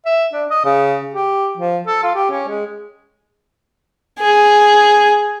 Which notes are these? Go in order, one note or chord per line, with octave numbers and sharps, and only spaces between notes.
E5
D4
D#5
C#3
G4
F3
A4
F4
G4
C#4
G#3
G#4